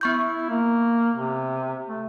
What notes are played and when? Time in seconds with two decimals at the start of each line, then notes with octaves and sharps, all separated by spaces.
0.01 B3 E4 C#6 G6
0.49 A#3
1.16 C3
1.88 A3